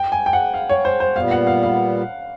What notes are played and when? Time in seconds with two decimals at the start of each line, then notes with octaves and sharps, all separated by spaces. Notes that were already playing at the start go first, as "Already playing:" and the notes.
Already playing: G5
0.12 G#5
0.26 G5
0.33 F#5
0.54 F5
0.69 C#5
0.85 C5
1.00 C5
1.16 A#2 G3 B3 F5
1.31 F#5
1.47 F5
1.63 F5